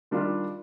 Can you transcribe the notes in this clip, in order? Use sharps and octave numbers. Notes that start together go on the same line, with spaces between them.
D#3 G3 D4 F4